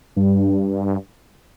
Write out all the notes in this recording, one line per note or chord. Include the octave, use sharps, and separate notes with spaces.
G2